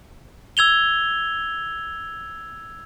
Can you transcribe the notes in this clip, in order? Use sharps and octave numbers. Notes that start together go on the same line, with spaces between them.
E6 G#6 F7 G7